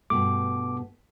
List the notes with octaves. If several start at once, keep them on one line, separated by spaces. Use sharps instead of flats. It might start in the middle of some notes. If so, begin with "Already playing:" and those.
G2 B2 A3 D6